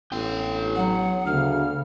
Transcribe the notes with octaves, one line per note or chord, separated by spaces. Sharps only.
A1 B3 G5
F#3 F#5
D2 C#3 F6